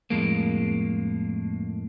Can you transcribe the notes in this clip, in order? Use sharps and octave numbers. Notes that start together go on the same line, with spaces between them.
F2 A2 G#3 A#3